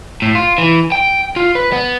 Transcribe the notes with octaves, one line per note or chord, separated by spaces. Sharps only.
A2
F4
E3
G5
F4
B4
B3